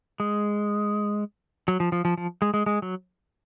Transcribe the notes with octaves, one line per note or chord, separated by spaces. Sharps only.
G#3
F#3
F3
F3
F3
F3
G#3
G#3
G#3
F#3